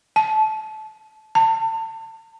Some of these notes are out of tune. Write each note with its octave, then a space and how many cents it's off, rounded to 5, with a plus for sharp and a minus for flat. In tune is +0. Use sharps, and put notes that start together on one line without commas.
A5 -20
A5 +35